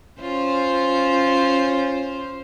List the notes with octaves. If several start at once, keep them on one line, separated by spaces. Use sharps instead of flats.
C#4 F4 C5